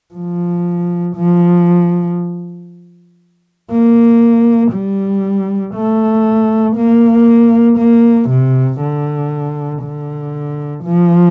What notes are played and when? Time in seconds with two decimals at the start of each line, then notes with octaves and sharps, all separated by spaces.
0.14 F3
1.16 F3
3.71 A#3
4.73 G3
5.75 A3
6.77 A#3
7.78 A#3
8.30 C3
8.81 D3
9.82 D3
10.84 F3